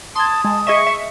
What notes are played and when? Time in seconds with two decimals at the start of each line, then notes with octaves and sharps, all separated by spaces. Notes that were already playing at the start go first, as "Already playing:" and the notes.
0.16 A5 C6 D#6 G#6
0.44 G#3 A5
0.67 G#4 D#5 E5 C#6
0.87 E5